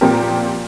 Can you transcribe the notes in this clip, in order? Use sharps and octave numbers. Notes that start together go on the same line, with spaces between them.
A#2 F3 C4 G4 A#4